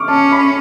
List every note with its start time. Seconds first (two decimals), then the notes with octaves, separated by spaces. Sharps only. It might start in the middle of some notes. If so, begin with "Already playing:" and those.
Already playing: C#6 D6 F6
0.08 C#4 A5
0.32 B5